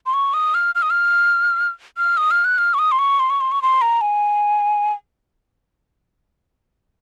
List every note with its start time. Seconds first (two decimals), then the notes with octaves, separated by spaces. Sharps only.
0.06 C6
0.14 C#6
0.34 D#6
0.54 F6
0.75 F6
0.82 D#6
0.90 F6
1.98 F6
2.17 D#6
2.31 F6
2.45 F#6
2.58 F6
2.74 C#6
2.79 D#6
2.92 C6
2.99 C#6
3.20 C6
3.30 C#6
3.41 C6
3.52 C#6
3.62 C6
3.81 A#5
4.01 G#5